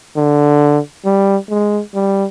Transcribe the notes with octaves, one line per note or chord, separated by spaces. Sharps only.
D3
G3
G#3
G3